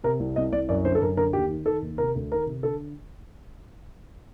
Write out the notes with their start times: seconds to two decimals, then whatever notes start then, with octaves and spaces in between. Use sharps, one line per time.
0.04 C3 A#4
0.20 C2
0.36 C2 D#5
0.52 C2 D5
0.69 F#2 D5
0.85 D3 C5
0.95 A4
1.02 F#2 A#4
1.17 D3 A#4
1.33 D#2 G4
1.51 D#3
1.66 D#3 A4
1.82 D#2
1.98 C3 A#4
2.15 D2
2.31 D#3 A#4
2.47 C3
2.63 D3 A4